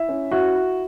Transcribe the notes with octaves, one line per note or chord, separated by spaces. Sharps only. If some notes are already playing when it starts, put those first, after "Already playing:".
Already playing: E4 E5
C#4
E4 F#4
E4